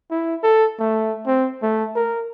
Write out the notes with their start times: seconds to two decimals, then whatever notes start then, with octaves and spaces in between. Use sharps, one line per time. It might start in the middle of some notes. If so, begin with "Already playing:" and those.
0.11 E4
0.43 A4
0.79 A3
1.26 C4
1.62 A3
1.96 A#4